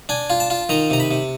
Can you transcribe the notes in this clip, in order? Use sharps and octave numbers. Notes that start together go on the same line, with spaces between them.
D4 G#5
F4
A5
F4
D#3 A#5
C3 A#5
B5
C3